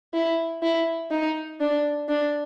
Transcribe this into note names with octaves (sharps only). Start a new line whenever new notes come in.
E4
E4
D#4
D4
D4